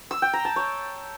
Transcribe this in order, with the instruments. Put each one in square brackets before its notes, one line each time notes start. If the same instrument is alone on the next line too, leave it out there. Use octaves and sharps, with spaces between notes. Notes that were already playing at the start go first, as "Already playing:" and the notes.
[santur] E6
G5
A#5
A5
C#5